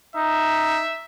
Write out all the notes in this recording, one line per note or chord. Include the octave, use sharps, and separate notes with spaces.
D#4 E5